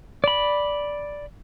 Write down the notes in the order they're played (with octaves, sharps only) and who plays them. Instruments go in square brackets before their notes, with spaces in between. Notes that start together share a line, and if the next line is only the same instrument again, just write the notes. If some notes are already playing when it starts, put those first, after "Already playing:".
[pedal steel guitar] D5 B5